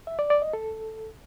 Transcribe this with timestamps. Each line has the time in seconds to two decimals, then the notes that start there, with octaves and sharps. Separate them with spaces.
0.07 E5
0.19 D5
0.30 D5
0.42 D#5
0.53 A4